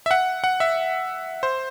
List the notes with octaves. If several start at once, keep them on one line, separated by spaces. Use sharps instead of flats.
E5
F#5
F#5
E5
C5